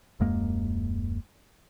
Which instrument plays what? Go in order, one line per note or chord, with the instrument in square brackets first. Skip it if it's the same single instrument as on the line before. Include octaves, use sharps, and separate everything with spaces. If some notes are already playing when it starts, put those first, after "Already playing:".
[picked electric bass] D#1 F#2 G#3 A#3